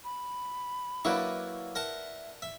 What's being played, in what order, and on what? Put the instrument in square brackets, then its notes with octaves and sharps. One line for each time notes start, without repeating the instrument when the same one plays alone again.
[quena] B5
[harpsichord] F#3 A#3 C#6 [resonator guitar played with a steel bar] E4 B4 D5
[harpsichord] A#4 F#5 A5 [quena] E5
[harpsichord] E5